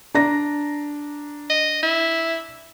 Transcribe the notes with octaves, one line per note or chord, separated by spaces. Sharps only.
D4 A#5 A#6
D#5
E4